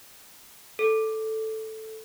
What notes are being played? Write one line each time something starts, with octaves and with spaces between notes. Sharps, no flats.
A4